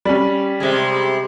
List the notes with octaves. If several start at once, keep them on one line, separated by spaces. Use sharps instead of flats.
G3 C#4
C3 G#3